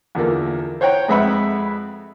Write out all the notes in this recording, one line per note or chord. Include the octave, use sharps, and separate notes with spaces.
E2 D3 F3 A#3
C5 C#5 F#5 G5 A#5
F2 G#3 B4 E5 F#5 B5